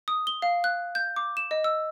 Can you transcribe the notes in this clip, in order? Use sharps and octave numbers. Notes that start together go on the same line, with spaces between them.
D#6
G7
F5
F#6
G6
D6
E7
D#5
E6